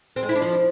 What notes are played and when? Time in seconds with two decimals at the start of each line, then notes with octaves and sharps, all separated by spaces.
0.16 C4
0.23 G#3
0.29 E4
0.35 D4
0.42 F3